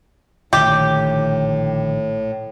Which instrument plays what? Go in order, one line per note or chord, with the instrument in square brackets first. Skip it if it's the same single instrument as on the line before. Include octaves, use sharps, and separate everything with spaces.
[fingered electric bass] A#1 D3 D#3 [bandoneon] A2 [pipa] G4